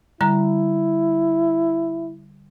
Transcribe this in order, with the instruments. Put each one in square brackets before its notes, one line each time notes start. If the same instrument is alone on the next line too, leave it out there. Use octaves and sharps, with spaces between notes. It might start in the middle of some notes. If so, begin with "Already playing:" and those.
[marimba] D3 G3 A#5 [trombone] E4